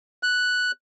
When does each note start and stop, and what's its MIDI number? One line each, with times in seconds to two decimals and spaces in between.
0.23 0.71 90